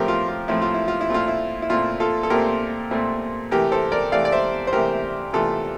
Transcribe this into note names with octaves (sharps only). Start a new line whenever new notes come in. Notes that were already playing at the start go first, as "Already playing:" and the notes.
Already playing: A2 F3 A3 C4 G4 A#4
F4
F4
A2 F3 A3 C4 E4
F4
E4
F4
E4
A#2 A3 C4 F4
E4
E4
A#2 A3 C4 F4
F4 A4
A4
A#2 A3 C4 G4 A#4
A#2 A3 C4
C3 E3 A3 G4 A#4
A4 C5
A#4 D5
C3 E3 A3 D5 F5
D5
C5 E5
C5
C3 E3 A3 G4 A#4
C3 E3 A3 F4 A4